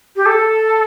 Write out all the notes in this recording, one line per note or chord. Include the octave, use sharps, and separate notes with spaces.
G4
A4